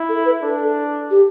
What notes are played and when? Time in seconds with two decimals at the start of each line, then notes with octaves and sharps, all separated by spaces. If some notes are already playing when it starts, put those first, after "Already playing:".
Already playing: E4
0.09 A4
0.25 B4
0.43 D4 A4
1.10 G4